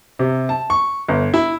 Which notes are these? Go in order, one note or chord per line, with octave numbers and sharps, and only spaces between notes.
C3
A5
C#6
G1
E4